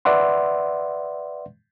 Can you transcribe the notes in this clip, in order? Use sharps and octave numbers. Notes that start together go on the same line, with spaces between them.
B4 D5 E5 F#5 C6